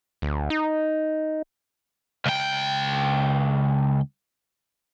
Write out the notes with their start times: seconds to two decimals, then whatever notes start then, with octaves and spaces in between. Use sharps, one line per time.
0.22 D2
0.50 D#4
2.26 C#2 G5